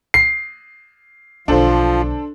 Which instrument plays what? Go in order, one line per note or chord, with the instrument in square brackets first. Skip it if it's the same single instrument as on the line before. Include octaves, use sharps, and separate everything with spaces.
[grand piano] C7
[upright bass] B1 D3 [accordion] F3 [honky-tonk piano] D4 A4 C5